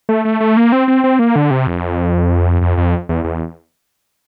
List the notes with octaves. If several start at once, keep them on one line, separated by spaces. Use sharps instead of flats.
A3
A3
A3
A#3
C4
C4
C4
A#3
D3
C3
F2
F2
F2
E2
E2